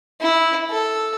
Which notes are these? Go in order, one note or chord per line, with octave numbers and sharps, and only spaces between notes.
E4
A4